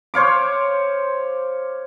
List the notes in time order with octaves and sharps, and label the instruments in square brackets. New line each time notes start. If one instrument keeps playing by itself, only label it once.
[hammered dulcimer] C5 C#5 F5 D6